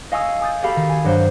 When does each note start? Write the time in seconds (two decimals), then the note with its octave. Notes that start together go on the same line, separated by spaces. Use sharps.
0.12 D#5 F5 G#5 C#6 D#6 E6
0.41 G#5 D#6 G6 A6
0.62 F#4 G4 A4 F5 B5
0.76 D#3
0.89 G#5
1.04 G2 F#3 C5